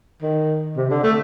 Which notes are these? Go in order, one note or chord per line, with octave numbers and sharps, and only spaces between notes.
D#3
C3
D3
A3